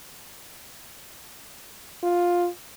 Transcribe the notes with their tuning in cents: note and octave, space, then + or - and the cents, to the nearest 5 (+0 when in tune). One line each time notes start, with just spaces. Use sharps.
F4 +10